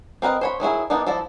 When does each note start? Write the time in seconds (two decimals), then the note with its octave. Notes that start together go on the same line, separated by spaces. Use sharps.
0.22 C4 A#4 B4 D#5
0.41 C5 C#5 B5
0.60 D#3 F#3 E4 G#4
0.90 E3 A#3 B3 D4 D#4
1.07 F3 E4 A4 D5